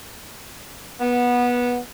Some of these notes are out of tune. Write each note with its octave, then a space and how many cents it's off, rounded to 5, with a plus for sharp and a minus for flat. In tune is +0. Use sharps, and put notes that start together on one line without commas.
B3 -15